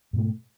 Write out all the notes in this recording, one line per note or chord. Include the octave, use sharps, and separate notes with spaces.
G#2 B2 A3